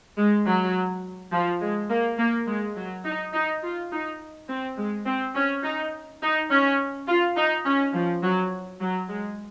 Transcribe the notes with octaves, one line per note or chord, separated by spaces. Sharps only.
G#3
F#3
F3
G#3
A#3
A#3
G#3
F#3
D#4
D#4
F4
D#4
C4
G#3
C4
C#4
D#4
D#4
C#4
F4
D#4
C#4
F3
F#3
F#3
G#3